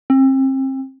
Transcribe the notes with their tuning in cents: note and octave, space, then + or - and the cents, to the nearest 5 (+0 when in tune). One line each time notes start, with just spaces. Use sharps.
C4 +35